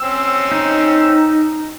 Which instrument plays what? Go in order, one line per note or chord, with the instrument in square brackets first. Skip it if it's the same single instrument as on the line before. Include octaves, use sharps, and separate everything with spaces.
[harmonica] C4 C#4 E6
[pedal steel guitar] D#4